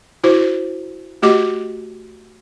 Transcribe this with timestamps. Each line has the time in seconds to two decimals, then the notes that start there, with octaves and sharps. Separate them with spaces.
0.24 E4 F#4 C5
1.22 A3 F#4 G4 D#5 D6